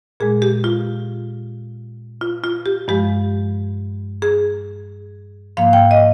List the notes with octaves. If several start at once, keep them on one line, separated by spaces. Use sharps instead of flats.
A#2 G#3 G#4
G4
F4
F4
F4
G4
G2 F3 G#3 G4
G#4
G#2 F3 A#3 F5
G5
D#5